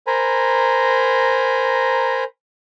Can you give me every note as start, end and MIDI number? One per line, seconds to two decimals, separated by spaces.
0.07 2.24 70
0.07 2.24 72
0.07 2.24 80
0.07 2.24 82
0.07 2.24 83